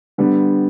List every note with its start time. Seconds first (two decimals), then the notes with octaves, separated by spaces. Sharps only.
0.18 D3 G3 B3